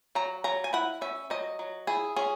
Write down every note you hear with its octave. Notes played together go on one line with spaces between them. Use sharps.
F#3 A#5
F#3 A#5
G#5
E4 F#5
C#4 E5
F#3 D#5
F#3
E4 G#4
C#4 G#4